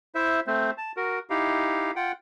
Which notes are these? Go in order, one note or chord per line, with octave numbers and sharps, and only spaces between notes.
E4 C5 E5
A3 C4 C5
A5
F#4 A#4
D#4 E4 G4 F5
F4 F#5 G5